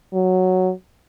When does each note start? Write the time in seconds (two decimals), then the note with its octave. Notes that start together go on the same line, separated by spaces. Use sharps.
0.14 F#3